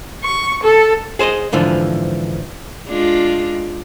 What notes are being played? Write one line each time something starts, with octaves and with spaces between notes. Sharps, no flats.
C#6
A4
G#4 C5 D5 D#5
G#2 D3 E3 F3
G#3 D4 F4